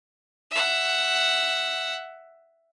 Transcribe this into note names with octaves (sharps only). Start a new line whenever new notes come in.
E5 F#5